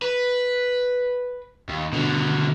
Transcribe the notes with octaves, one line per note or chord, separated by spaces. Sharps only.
B4
D#2
B2 D3